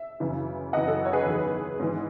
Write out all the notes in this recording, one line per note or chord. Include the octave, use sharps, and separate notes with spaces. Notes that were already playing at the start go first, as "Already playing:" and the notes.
Already playing: E5
F#2 C#3 E3
F#2 C#3 E3 D#5 F#5
A4
C#5
G#4 B4
E2 D#3
G#2 E3